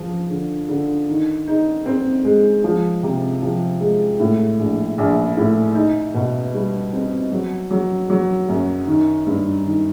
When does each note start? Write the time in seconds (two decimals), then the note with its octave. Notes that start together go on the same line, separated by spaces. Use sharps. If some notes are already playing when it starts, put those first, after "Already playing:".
Already playing: F3
0.30 D3
0.69 D3
1.09 D#3
1.47 D#4
1.86 C4
2.24 G#3
2.64 F3
3.03 C3
3.42 F3
3.80 G#3
4.19 A2
4.59 A#1
4.98 A#1
5.37 A2
5.75 D#4
6.14 B2
6.54 G3
6.93 C4
7.32 F#3
7.71 F#3
8.10 F#3
8.49 F#2
8.87 D#3
9.27 G2
9.65 D#3